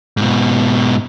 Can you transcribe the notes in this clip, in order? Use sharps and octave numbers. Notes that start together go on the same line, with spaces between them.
G#2 B2